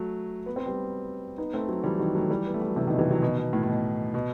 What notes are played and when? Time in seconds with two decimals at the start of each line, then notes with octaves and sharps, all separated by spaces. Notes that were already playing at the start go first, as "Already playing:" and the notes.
Already playing: F#3 A3
0.46 B3
0.56 C4
0.66 G3 B3
1.38 B3 D#4
1.54 A3 C4
1.69 F#3 A3
1.84 E3 G3
2.00 D#3 F#3
2.15 F#3 A3
2.30 E3 G3
2.46 B3
2.54 A3
2.61 G3
2.69 F#3
2.76 C3 E3
2.87 B2 D#3
2.99 C3 E3
3.11 D#3 F#3
3.22 B2 D#3
3.38 B2
3.53 A2
3.63 A2
3.68 B2
4.14 B2